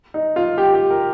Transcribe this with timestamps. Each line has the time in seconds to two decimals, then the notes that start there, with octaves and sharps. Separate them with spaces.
0.14 D#4
0.36 F4
0.58 G4
0.74 G4
0.91 A#4